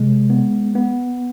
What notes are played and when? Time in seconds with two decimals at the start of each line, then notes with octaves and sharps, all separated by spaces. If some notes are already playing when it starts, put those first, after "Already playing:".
Already playing: C3 G#3
0.30 B3
0.75 B3